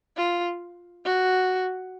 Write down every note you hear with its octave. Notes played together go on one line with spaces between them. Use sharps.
F4
F#4